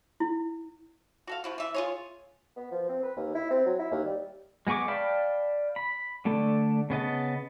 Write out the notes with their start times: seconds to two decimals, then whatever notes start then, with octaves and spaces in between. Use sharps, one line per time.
0.20 E4
1.27 F#4 A4 F5
1.44 F3 E4 F#4
1.58 E3 E5
1.74 F4 G#4 C#5
2.57 B3
2.71 F3
2.89 C4
3.03 B4
3.17 D#2
3.35 E4
3.50 C4
3.66 F#3
3.79 E4
3.91 D#2
4.05 G3
4.67 G#3 B3 G#4 C#6 D6
4.88 D5 F5 G5 A5 B5
5.76 B5
6.25 D3 A3 D4 A4
6.90 C#3 B3 D#5 A5